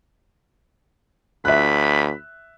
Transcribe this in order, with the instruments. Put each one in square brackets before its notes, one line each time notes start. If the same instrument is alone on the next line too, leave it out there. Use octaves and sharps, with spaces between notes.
[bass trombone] D2 [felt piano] E5 F#6 [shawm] B5